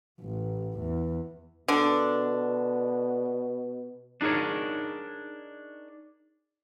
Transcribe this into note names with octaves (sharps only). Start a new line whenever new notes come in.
A1
E2
B2 D3 D4
D4 D#4 G#4 A#4 C#5